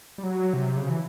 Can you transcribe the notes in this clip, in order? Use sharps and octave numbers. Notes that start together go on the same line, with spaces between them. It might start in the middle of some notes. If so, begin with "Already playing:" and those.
G3
F#3
C3
C#3
E3